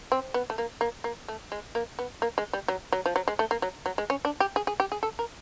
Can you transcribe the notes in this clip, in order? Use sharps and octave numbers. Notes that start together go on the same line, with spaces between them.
C4
B3
A3
A#3
A#3
A#3
A3
G#3
A#3
B3
A#3
G#3
G3
F#3
F#3
F3
F#3
G#3
A3
A#3
F#3
F#3
G#3
C#4
D4
G4
G#4
G#4
G4
G#4
A4
A#4